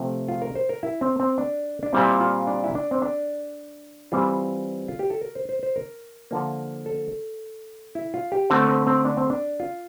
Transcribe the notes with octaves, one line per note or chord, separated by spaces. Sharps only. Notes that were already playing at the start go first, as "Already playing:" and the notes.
Already playing: C3 F3 A3 C4 G4
F4
A#4
C5
A#4
E4
C4
C4
D4
D4
A#2 G3 C4 E4
F4
D4
E4
D4
C4
D4
E3 G3 C4 F4
F4
G4
A4
A#4
C5
C5
C5
A#4
D3 F3 A#3
A4
E4
F4
G4
D3 A3 C4
C4
C4
D4
C4
D4
F4